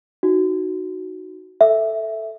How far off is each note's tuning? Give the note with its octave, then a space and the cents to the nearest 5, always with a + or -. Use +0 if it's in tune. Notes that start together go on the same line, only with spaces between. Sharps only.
D#4 +0 F#4 +0
A4 +0 E5 +0